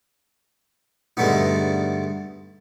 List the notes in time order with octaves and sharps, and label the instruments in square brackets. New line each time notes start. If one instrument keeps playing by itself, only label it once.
[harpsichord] G2 D3 G#3 A3 B3 D#4